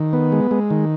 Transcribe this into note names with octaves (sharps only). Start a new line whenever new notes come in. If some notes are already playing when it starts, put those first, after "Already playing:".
Already playing: D#3
B3
G#3
G#3
D#3